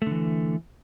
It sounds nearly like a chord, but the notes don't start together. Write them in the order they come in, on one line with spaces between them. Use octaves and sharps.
A3 D3 E3